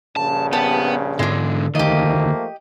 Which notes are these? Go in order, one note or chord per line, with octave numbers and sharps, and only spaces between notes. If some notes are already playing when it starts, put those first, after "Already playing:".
A#1 G2 C#3 A5
B3 G4 A5
G#2 D3 G#3 D4
D2 D#3 F3 A3 A#3 G4 D#5